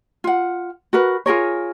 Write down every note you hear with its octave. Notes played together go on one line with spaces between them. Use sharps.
F4 F#5
F#4 A#4 B4
F4 G#4 A#4 C#5